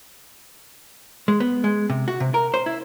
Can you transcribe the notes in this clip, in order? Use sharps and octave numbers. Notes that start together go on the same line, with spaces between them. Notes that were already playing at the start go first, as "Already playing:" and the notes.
G#3
B3
G#3
C3
F#4
C3
A#4
C5
E4